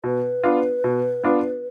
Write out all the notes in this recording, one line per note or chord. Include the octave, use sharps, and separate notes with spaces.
B2 B4
B3 D4 F4
B2
B3 D4 F4